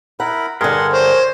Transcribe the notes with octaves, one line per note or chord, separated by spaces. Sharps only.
E4 A#4 F#5 B5
G2 D3 G#4 A#4 F#5 C6
C5 C#5